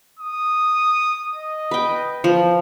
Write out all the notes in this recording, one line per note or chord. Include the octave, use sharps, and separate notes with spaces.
D#6
D#5
B4 G5
F3